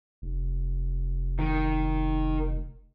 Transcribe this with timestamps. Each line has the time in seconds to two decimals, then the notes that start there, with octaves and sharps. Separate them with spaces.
0.22 F1
1.39 D#3